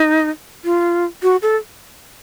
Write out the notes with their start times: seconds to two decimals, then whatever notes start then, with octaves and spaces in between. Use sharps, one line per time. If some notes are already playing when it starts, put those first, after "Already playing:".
Already playing: D#4
0.65 F4
1.23 F#4
1.42 A4